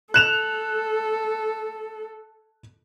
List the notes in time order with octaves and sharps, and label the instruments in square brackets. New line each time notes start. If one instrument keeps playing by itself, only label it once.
[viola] A4 [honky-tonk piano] F#6 E7 F7